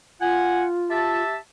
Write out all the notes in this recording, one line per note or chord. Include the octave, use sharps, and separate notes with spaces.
F4 F#5 G#5
G4 E5 A5